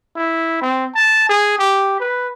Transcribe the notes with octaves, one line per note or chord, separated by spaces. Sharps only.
E4
C4
A5
G#4
G4
B4